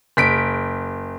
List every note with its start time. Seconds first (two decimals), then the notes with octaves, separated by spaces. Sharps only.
0.17 F#1 B6 D7